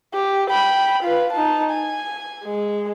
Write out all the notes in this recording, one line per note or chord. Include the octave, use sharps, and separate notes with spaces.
G4
G5 B5
F4 B4
D#4 A5
G#5
G#3